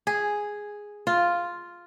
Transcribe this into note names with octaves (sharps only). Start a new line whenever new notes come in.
G#4
F4